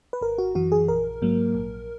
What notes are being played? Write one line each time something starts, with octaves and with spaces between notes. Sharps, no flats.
B4
G#1 A#4
F#4
F#2 E3 F#4
G#4
A#1 A#4
G#2 F#3 A#3
A#1